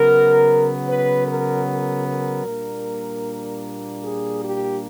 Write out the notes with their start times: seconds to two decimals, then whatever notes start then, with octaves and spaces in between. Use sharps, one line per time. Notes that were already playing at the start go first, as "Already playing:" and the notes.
Already playing: C#3 F#3 B3 A#4
0.87 B4
1.27 A#4
1.67 A#4
2.06 A#4
2.45 A#2 G3 A#3 D4
4.03 G#4
4.42 G4